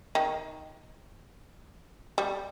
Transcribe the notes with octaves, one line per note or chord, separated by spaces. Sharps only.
D#3
G3